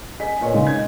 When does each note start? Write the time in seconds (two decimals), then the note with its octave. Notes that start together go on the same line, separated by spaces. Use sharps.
0.20 G#4 D#5 B6
0.41 A#2 B3 C#5
0.54 E1 C#3 G#3 D#4 F5
0.67 G#6